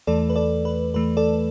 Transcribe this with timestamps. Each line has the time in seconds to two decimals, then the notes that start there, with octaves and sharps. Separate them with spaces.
0.07 E2 E3 A3 A4 D5
0.30 B4
0.36 A4 D5
0.65 B4
0.94 E2 E3 A3 B4
1.17 A4 D5